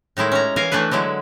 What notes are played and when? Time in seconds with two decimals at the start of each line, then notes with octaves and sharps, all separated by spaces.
0.17 A2 D#3 G#3 E4
0.32 C#4 A#5
0.56 E3 A#4 F5 G#5 A#5
0.72 E3 A3 D4 E4 B4
0.91 D3 F#3 G#3 E4